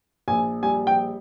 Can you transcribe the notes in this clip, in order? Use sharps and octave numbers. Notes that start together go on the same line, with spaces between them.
A#1 G#5
G3 G#5
G5